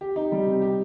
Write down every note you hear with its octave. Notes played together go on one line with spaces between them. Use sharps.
G4
D#4
G3
C3
G4